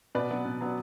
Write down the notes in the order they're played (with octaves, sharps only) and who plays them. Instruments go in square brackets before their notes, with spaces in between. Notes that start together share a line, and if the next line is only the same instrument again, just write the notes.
[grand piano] B2 B4 D5
F#3 B3 D4
B2
F#3 B3 D4